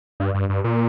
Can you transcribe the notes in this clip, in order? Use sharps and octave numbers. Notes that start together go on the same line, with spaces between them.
G2
G2
G2
A#2